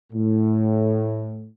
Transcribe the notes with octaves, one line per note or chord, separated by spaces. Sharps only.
A2